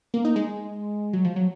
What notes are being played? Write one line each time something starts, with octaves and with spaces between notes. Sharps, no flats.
A#3
D#4
G#3
F#3
F3
F#3